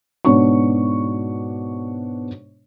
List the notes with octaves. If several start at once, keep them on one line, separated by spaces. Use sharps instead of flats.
G#2 B2 B3 D4 C#5 C#6